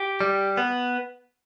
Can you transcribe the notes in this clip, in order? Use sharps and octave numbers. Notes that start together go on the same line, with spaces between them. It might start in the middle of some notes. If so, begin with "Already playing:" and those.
Already playing: G4
G3
B3